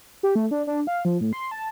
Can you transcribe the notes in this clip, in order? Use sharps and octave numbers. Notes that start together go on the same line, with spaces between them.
G4
A3
D4
D4
F5
F3
A2
C6
A5